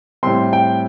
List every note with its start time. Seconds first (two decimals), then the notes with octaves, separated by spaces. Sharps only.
0.23 A2 G3 C4 C6
0.53 G5